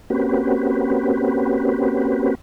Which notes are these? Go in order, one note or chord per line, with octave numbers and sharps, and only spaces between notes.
A#3 C4 C#4 F#4 G4 B4